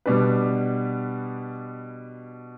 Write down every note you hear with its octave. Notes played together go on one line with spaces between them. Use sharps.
B2 G3 D4 B4